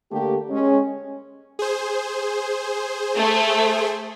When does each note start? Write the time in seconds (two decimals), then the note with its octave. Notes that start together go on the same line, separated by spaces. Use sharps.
0.12 D3 A3 A#3 G4
0.50 G#3 C#4
1.59 G#4 C5
3.16 A3